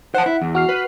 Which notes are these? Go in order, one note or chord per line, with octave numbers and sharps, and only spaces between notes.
C5 F#5 A5
E4
E2
F#4 F6 C7
B4